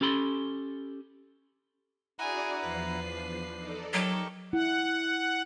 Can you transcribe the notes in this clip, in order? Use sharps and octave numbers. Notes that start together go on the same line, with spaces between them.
C#4 G4 A4 B5 C6
D4 E4 F#4 G#4 D5 F#5 G#5 A#5
E2 F3 B4 C7
D4
D#4 A4 D5
F#3 D#4 G4 A4 A#4 C#6
E4 F#5